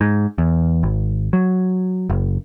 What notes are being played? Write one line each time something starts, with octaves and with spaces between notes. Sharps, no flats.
G#2
E2
G#1
F#3
F#1